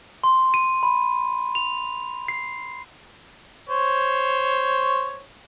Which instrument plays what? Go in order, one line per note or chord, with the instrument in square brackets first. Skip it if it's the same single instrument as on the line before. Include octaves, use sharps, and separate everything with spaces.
[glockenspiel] C6
D#7
B5
F7
C7
[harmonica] C5 C#5